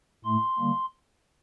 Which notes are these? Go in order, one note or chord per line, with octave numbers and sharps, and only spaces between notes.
A2 A3 C6
D3 G3 A#3